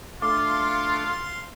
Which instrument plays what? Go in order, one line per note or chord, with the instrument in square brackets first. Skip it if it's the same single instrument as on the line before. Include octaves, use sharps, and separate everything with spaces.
[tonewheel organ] A3 D4 A4 [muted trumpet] F4 [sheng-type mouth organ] F5 C6 [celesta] D6